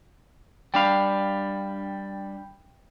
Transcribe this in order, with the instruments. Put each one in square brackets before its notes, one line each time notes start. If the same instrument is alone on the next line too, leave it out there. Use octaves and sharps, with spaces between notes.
[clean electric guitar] G3 D4 F5 [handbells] G5 B5